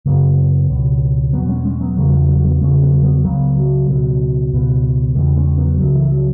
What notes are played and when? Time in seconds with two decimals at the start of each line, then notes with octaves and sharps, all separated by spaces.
0.06 F#2 C#3 F#3 B3
0.69 C#2 B2
1.33 E2 B2 F#3 B3
1.49 G#3 C#4
1.65 G#3 C#4
1.81 F#3 B3
1.97 E2 C#3 E3 G#3
2.06 F#3
2.13 E3
2.29 F#3
2.45 F#3 B3
2.60 E2 C#3 G#3 C#4
2.82 F#3 B3
3.03 F#3 B3
3.24 C#2 C#3 F#3 B3
3.57 F#3
3.88 C#2 B2 F#3
4.52 C#2 B2
5.15 E2 C#3 E3 G#3
5.36 G#3 C#4
5.58 F#3 B3
5.80 C#2 C#3 F#3
5.95 E3
6.11 F#3